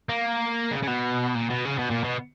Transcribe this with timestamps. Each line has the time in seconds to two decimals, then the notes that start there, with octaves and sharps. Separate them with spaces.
0.09 A#3
0.71 C#3
0.83 C#3
0.87 B2
1.35 A#2
1.50 B2
1.65 C#3
1.78 B2
1.90 A#2
2.04 B2